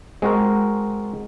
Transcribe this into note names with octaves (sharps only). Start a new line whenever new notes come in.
G#3 C4 F#4 A#4